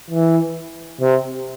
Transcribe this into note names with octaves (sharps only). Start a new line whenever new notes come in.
E3
C3